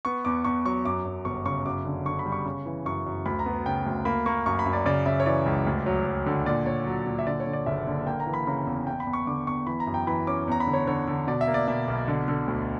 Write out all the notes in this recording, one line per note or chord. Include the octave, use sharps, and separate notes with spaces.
B3 C#6
E2 D6
E2 C#6
F#3 C#6
F#2 D6
F#2
G1 C#6
C#3 C#6
F#2 D6
D3
D3 C#6
B5
G3
C#6
C#3
E3
F#2 C#6
F#2
D2 B5
A#5
B3
C#3 G5
D2
A#3 B5
A#3 C#6
F#2 C#6
B5
F#2
D5
C#3 D5
C#3 E5
C#5
E3 D5
C#2
D2
F#3
F#3
D3
A#2 D5
A#2 C#5
F#3
A#2
E5
D3 D5
C#5
D3
D5
F#1 E5
D3
A#3 G5
A#5
E3
B5
C#3 A#5
E2
E2 G5
B5
E2
C#6
D3 D6
E2 C#6
E3 B5
A#5
F#2
G5
E3 B5
C#4 D6
E2 A#5
B5
D3
C#5
D3 C#5
D3
B2 D5
E5
A#3
D5
B2 E5
B1
D3
D3
D2